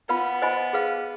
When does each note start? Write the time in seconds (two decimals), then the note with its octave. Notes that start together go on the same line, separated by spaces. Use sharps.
0.09 B3 F4 B4 F5 B5
0.42 C5 D#5 G#5 B5
0.73 G#4 B4 F5